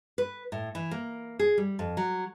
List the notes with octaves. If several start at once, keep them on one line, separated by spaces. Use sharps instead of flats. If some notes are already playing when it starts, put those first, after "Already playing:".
B4
A2
E3
A#3
G#4
G3
F2
F#3